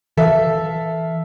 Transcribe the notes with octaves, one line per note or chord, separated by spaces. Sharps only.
E3 A4 E5 F5